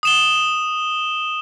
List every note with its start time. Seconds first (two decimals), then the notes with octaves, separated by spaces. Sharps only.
0.03 D#6 E7 G7